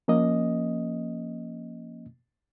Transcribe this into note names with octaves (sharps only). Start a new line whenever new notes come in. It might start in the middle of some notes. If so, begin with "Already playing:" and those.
F3 A#3 C#4 D#5